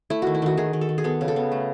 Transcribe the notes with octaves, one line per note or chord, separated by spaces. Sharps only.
A3 E4
D#3 F#4
E4
D#3 F#4
D#3 G#4
D#3
A4
D#3
G#4
B3 A4
C#3
A4
B3
A3